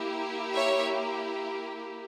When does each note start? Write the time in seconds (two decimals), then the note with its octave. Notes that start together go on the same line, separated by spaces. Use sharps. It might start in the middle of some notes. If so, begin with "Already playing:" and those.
Already playing: A#3 E4 G4
0.55 C#5 E5